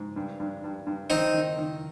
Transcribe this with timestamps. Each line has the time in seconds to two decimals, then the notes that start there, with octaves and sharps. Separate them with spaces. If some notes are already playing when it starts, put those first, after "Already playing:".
Already playing: G#2
0.16 G2
0.40 G2
0.64 G2
0.87 G2
1.10 D#3 C4 D#4
1.34 D#3
1.58 D#3